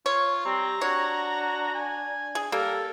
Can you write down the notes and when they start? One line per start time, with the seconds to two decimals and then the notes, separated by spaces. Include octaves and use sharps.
0.06 F4 C#5
0.45 G3 C4 A#5
0.81 D4 F#4 C#5
1.75 G#5
2.35 G#4
2.52 G3 A#3 A4 A#4